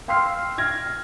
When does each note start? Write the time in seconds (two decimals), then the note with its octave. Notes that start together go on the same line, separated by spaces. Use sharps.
0.08 F5 G5 C6 E6 F6 C7
0.58 F6 G#6 A#6